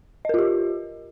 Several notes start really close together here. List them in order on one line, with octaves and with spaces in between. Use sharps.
D#5 A#4 F4 G4